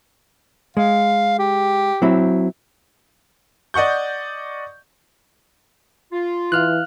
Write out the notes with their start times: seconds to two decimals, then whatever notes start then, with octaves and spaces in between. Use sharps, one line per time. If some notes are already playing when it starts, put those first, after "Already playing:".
0.77 G#3 F5
1.39 G4
2.02 F#3 C4 E4
3.74 D5 D#5 F#5 C#6 G6
6.12 F4
6.52 E3 F5 F6 F#6